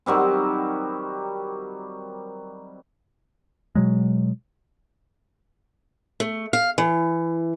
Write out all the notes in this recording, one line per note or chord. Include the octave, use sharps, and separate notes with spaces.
D#3 F#3 G3 C4
B2 F#3 G#3
A3
F5
E3